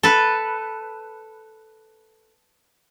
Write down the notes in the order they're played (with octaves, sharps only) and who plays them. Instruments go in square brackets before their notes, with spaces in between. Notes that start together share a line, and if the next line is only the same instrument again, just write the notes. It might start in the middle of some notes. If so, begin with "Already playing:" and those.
[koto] A4 B4